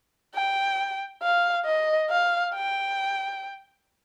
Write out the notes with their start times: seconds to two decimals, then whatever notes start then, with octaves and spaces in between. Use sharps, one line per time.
0.35 G5
1.22 F5
1.66 D#5
2.10 F5
2.54 G5